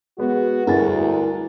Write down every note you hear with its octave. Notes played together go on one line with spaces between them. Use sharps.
G#3 B3 F#4
D2 G2 E4 G#4 A#4 A6